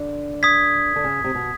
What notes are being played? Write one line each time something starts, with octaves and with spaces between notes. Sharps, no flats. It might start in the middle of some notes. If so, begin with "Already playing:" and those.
Already playing: D3
D#6 G#6 B6
D3
C#3
C3
B2